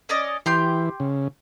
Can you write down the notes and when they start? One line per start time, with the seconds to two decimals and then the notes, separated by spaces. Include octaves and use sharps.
0.09 C#4 D5 D#5
0.46 E3 G4 C6 G6
1.00 C#3